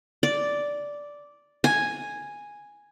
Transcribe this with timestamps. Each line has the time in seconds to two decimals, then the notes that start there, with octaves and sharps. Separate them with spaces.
0.23 D5
1.64 G#5